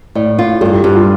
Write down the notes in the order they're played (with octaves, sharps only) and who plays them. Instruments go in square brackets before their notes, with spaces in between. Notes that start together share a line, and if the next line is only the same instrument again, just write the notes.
[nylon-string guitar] A2 [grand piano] D5
[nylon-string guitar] F4
[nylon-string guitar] G2 [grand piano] A4
[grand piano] G4
[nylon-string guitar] G2 [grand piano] G4
[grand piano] F4